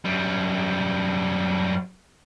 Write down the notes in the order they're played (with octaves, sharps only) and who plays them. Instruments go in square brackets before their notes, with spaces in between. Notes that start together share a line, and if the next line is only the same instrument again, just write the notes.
[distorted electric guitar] F#2 G3